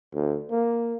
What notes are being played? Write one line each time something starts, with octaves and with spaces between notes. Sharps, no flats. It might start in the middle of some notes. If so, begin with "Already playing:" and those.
D2
A#3